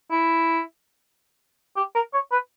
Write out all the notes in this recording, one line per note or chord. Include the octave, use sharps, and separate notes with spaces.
E4
G4
A#4
C#5
B4